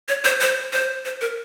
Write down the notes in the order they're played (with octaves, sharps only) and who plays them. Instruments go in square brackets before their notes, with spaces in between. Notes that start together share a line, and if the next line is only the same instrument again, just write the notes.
[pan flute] C#5
C5
C5
C5
C5
A#4